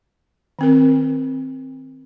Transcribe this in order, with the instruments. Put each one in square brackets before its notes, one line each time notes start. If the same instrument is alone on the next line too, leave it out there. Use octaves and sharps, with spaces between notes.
[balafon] D#3 C4 A#4